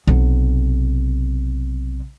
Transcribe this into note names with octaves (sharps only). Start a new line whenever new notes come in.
B1 C3